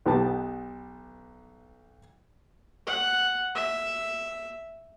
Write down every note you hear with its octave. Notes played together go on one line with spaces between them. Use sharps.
B1 B3 G4 A5
F#5
E5